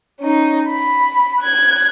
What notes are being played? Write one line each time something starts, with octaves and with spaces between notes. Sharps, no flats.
C#4 D#4
B5
F#6 G#6